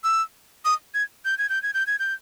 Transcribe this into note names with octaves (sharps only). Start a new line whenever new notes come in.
E6
D#6
G#6
G6
G#6
G6
G#6
G6
G#6
G6